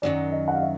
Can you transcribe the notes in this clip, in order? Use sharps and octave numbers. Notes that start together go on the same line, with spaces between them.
F#2 D#3 F#3 D5
D#5
F#5
F5
E5